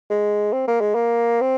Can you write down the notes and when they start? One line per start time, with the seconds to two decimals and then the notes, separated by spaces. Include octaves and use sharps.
0.10 G#3
0.53 C4
0.68 A#3
0.81 G#3
0.95 A#3
1.41 C4